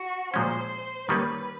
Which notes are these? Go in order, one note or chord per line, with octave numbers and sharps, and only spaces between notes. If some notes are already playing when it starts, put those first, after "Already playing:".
Already playing: F#4
A#2 F3 G#3 C#4 C5
D#3 G3 A#3 C#4 B4